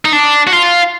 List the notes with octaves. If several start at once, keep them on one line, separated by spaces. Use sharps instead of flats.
D#4
D4
F#4
F4